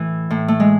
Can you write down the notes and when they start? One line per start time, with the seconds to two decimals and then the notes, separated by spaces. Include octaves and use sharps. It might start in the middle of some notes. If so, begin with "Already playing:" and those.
Already playing: A2 E3
0.30 A2
0.48 A3
0.60 G#3